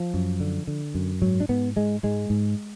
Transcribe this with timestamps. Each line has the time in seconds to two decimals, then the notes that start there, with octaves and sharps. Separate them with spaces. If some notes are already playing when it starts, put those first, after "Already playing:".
Already playing: F3
0.14 F#2
0.40 D3
0.67 D3
0.95 F#2
1.21 G#2 F#3
1.40 D4
1.49 G#2 B3
1.76 G#2 G#3
2.03 G#2 G#3
2.30 G#2